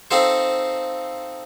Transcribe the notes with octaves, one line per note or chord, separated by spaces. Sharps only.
C4 D#4 F4 A4 C5